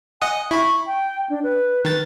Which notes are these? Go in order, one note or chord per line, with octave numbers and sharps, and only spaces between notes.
D#5 F#5 G#5 D#6
E4 B5 C#6
G5
D4
B4
D#3 B4 A6